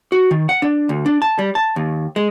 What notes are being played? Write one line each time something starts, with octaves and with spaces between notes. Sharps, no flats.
F#4
D#3
F#5
D4
D2
D4
A5
G3
A5
D#2
G#3